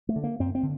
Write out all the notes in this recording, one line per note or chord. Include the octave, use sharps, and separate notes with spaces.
A3
D3
A#3
F#2 C4
C4
D3